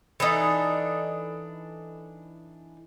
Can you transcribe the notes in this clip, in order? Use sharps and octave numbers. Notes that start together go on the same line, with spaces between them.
E3 D4 D#4 A4